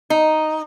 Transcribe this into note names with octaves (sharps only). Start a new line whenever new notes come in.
D#4